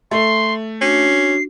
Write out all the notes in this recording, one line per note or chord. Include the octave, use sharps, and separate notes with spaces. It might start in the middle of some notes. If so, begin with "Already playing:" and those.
A3 C6
C#4 D4 F#4 C7